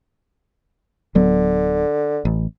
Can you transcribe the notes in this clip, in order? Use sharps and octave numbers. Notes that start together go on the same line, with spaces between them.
D1 D3 F#3 B3
A1